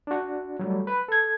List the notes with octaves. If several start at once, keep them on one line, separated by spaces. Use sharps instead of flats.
D4 F#4
F#3 G3 A3
B4
A4 G#6